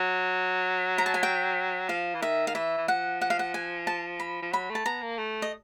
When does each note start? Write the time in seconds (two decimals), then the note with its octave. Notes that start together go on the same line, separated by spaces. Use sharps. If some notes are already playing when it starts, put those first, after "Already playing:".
Already playing: F#3
0.98 A#5
1.06 A5
1.14 G#5
1.23 G5
1.89 F3 F5
2.15 E3
2.22 D#3 E5
2.47 F5
2.55 E3 E5
2.78 E3
2.88 F3 F#5
3.21 F#5
3.30 F5
3.39 F#5
3.54 G#5
3.87 A5
4.20 B5
4.42 F3
4.53 F#3 B5
4.70 A3
4.75 A5
4.86 B3 A#5
5.02 A#3
5.18 A3
5.42 D#5